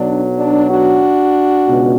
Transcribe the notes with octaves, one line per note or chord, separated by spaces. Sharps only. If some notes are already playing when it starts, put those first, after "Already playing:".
Already playing: B1 B2 F#3 D4
D4
D4 F#4
C#2 B2